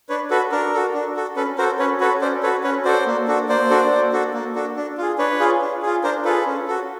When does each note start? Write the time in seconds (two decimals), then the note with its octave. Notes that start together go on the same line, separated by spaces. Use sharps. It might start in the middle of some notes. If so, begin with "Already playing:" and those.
0.09 D4 B4 C#5
0.30 F#4 A4 B4
0.52 D4 A#4
0.74 F#4 A4
0.94 D4
1.16 F#4 A4
1.36 C#4 A4 B4
1.58 F#4 A4 A#4 C5
1.79 C#4 B4 C#5
2.00 F#4 A4 B4 C#5
2.21 C#4 C5 D5
2.43 F#4 A4 B4 C#5
2.64 C#4 B4 C#5
2.85 F#4 A4 C5 D5
3.07 A#3
3.28 D4 F#4 A4
3.49 A#3 C5 D5
3.70 D4 F#4 A4
3.92 A#3
4.12 D4 F#4 A4
4.34 A#3
4.55 D4 F#4 A4
4.76 D4
4.98 F4 G#4
5.18 D4 B4 C#5
5.40 F4 G#4
5.62 D4
5.82 F4 G#4
6.04 D4 A#4 C5
6.25 F4 G#4 A4 B4
6.46 C#4
6.68 F#4 A4